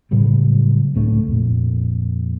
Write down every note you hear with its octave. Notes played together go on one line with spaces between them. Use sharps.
A2 C#3 F#3 G3
C#2 A2 A3 D4
F2 A#2